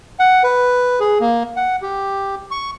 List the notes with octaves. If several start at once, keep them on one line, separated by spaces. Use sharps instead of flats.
F#5
B4
G#4
A#3
F#5
G4
C#6